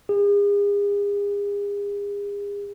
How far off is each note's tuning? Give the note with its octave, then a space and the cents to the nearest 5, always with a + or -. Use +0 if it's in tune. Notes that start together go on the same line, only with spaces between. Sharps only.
G#4 -40